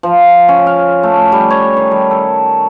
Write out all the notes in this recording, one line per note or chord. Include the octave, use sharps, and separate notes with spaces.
F3
C#4
F5
A3
G3
C#5
D#3
G3
A4